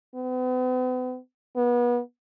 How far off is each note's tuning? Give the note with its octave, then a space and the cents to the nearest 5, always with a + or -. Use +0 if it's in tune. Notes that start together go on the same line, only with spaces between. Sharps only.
B3 +45
B3 -30